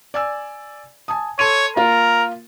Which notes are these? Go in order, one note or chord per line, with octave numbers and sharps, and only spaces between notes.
D5 G#5 E6
G#5 A5 D#6
A4 C#5 C6 D#7
A#3 F4 A#4